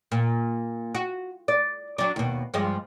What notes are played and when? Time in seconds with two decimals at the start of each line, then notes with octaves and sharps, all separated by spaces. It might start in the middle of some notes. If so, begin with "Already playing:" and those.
0.12 A#2
0.95 F#4
1.48 D5
1.98 F#3 D4
2.16 D#2 B2
2.54 G2 F3 G#3